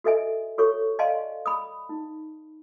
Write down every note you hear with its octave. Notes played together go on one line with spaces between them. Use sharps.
F#4 A4 D#5 E5 G#5
F#4 A4 C#5 C#6
D5 D#5 F5 G#5 A5 C6
B5 D#6
D#4